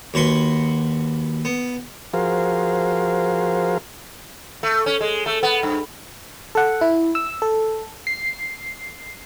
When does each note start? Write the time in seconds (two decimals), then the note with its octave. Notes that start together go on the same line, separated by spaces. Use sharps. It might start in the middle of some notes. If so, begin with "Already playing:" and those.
0.14 D#2 F#4 B4 C6 C#6
1.45 B3
2.14 F3 F#4 G#4 A#4 C5 F5
4.63 A3
4.86 C#4
5.01 G#3
5.26 A3
5.43 B3
5.63 G2
6.55 A4 F#5
6.81 E4
7.15 E6
7.42 A4
8.07 C7